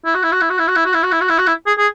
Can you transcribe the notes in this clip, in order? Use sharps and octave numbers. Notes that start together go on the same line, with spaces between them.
E4
F#4
E4
F#4
E4
F#4
E4
F#4
E4
F#4
E4
F#4
E4
F#4
E4
F#4
E4
G#4
G#4